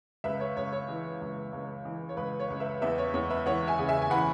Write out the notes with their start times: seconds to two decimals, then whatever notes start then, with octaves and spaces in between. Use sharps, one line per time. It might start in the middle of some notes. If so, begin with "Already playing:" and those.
0.24 C#2 B4 E5
0.40 C#5
0.57 C#2 C#5
0.73 C#5
0.88 E3
1.22 C#2
1.53 C#2
1.85 E3
2.09 C#5
2.17 C#2 B4
2.40 C#5
2.50 C#2
2.60 B4 E5
2.81 E2 B4 E5
2.98 C#5
3.14 E2 C#5
3.30 B4 E5
3.46 E3 C#5 F#5
3.67 E5 G#5
3.79 C#3
3.89 E5 G#5
4.02 G#5
4.10 E3 F#5 B5